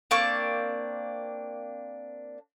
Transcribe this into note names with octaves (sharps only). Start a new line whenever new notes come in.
A#3 C4 D4 C#6